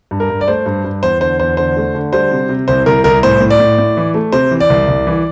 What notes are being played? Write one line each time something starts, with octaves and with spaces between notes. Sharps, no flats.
G2
A#4
G2
D5
A3 C5
G2
G2
E2 C5
D3 C5
E2 C5
D3 C5
A3
D3
G3 C5
C3
C3
C2 C5
C2 A#4
C2 A#4
A2 C5
A2
D5
A2
A2
E3
A3
C3 C5
E3
D5
C2
C2
E3